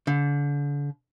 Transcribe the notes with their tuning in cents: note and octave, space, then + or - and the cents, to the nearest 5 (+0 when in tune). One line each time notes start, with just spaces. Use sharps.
D3 -35